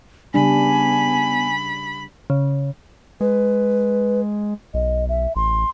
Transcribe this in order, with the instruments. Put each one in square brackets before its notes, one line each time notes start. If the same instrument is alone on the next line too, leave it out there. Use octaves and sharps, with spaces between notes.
[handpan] C#3 G3 D4 [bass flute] B3 [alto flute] G#5 [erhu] B5
[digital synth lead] C#3
[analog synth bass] G#3 [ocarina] B4
[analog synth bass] B1 [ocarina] D#5
[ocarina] E5
[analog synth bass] A1 [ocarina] C6